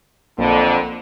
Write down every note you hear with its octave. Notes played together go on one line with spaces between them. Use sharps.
B1 F2 D3 A#3